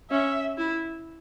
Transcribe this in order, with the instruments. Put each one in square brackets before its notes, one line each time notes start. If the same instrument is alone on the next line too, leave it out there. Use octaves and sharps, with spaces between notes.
[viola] C#4 [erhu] E5
[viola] E4